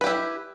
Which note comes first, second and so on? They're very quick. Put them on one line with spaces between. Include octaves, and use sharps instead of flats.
B4 G4 E4